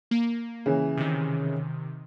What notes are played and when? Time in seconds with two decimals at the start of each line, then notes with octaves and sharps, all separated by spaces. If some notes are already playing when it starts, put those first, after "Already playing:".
0.11 A#3
0.66 C#3 E3
0.97 C3 D#3